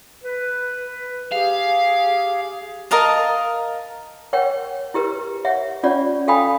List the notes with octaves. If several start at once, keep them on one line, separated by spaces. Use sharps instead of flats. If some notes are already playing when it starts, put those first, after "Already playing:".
B4
G4 G#4 F5
A#4 D#5 F5 A5
A#4 C#5 F#5 G5
E4 G4 A#4 B4
C#5 E5 F#5
C#4 F4 C#5 D5 F#5
A4 F5 G5 G#5 B5 D#6